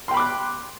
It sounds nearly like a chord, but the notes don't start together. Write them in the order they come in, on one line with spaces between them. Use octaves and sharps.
C6 G5 B5 D6 F#6